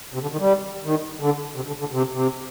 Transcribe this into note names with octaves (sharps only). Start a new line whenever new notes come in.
C3
D3
D#3
G3
D#3
D3
C3
D3
D3
C3
C3